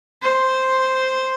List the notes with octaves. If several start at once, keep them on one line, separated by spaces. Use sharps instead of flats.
C5